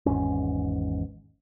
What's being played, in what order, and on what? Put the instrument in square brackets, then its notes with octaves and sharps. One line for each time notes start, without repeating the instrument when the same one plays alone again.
[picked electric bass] G#1 E2 G#2 C#4